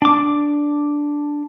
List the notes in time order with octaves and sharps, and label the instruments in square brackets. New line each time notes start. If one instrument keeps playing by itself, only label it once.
[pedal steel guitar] D4 D6